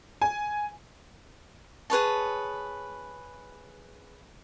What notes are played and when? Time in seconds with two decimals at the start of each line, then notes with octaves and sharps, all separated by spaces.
0.22 G#5
1.90 G#4 B4 C#5 A5